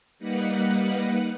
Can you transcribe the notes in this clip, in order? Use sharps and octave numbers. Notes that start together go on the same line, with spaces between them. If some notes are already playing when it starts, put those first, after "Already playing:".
G3 A#3 D#4 B4 F#5